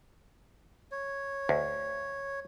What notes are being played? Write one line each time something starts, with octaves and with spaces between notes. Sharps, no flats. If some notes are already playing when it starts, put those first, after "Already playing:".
C#5
D2